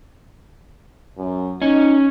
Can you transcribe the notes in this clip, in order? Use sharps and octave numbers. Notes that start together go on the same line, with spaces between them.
F#2
C#4 D#4